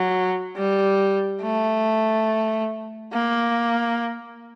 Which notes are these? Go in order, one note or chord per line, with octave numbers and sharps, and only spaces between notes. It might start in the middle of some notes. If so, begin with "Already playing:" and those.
Already playing: F#3
G3
A3
A#3